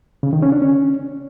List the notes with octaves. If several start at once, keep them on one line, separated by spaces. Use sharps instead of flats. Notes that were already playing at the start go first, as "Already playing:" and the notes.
C#3
D#3
C#4
D4
C#4